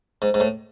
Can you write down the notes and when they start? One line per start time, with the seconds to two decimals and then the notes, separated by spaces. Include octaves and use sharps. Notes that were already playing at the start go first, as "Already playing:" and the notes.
0.22 G#2
0.34 G#2
0.40 A2